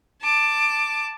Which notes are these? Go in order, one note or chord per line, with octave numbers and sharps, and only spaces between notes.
A5 D6